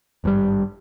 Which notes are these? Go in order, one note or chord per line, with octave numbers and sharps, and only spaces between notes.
G#1 G2 C3 G3